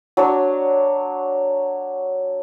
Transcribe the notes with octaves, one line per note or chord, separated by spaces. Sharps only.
F#3 D4 C#5